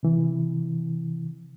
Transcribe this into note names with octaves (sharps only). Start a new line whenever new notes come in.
C3 E3